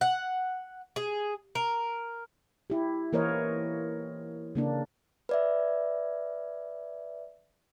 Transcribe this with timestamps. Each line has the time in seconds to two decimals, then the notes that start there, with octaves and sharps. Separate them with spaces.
0.01 F#5
0.96 G#4
1.55 A#4
2.70 E4 G4
3.13 E3 A#3 A#4 C5 C#5 D#5
4.55 C#3 A#3 D4
5.29 B4 D5 E5